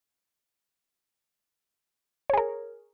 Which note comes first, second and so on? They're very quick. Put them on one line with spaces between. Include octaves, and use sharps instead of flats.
C#5 G#4 A#4